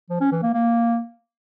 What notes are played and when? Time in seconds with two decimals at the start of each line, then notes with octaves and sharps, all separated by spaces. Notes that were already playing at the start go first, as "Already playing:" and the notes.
0.10 F3
0.20 C#4
0.31 E3
0.42 A#3
0.53 A#3